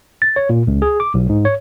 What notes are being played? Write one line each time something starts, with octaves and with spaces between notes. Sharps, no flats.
A6
C#5
A#2
C#2
G#4
D6
B1
G#2
C#5